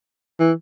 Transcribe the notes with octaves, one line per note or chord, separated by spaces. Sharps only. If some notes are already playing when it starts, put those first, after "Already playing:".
E3